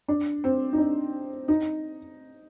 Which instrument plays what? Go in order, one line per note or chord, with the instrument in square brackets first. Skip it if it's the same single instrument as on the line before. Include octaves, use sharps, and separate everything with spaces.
[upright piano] D4
C4
D#4
D4
D#4